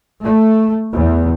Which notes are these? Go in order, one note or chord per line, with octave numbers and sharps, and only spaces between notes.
A3
E2